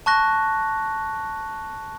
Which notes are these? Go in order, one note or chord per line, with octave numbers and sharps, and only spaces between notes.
A5 C#6 F#6 A#6